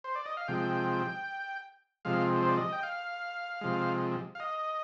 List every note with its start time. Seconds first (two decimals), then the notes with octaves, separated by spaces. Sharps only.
0.04 C5
0.15 D5
0.26 D#5
0.37 F5
0.48 C3 F3 G#3 G5
2.05 C3 F3 G#3 F5
2.42 C5
2.49 D5
2.57 D#5
2.72 G5
2.83 F5
3.61 C3 F3 G#3
4.35 F5
4.40 D#5